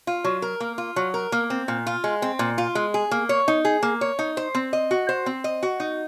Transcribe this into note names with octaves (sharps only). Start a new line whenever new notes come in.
F4
F#3
A#4
A#3
F4
F#3
A#4
A#3
C4
A#2
F4
G#3
C4
A#2
F4
G#3
G#4
A#3
C#5
D#4
G#4
A#3
C#5
D#4
C5
C4
D#5
F#4
C5
C4
D#5
F#4
D#4